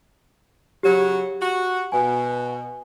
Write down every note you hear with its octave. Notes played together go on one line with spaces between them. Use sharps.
C#3 F#3 G4
F#4
B2 G#5